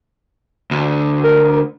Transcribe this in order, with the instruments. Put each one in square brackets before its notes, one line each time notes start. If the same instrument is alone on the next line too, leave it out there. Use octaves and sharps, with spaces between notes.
[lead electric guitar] D2
[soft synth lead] A#4